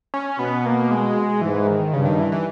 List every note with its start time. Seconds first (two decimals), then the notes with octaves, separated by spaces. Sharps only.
0.14 C#4
0.39 B2 B3
0.66 A#3
0.91 G#3
1.41 G#2 E3
1.67 D#3
1.93 G2 C#3
2.05 D#3
2.19 E3
2.32 E3